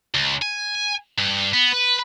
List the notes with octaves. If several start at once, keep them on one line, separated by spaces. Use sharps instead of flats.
C#2
G#5
G2
B3
B4